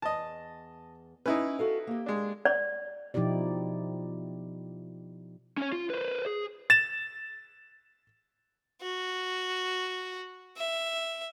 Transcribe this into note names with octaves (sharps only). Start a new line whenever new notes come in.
E2 D#5 A5
C#4 D#4 E4 B4
F#4 A4 F5
A#3 G4
G#3 D4
D5
B2 F3 D#4 E4 G4 D5
C#4 C#5
F4
B4 C5
G#4
A6 E7
F#4
E5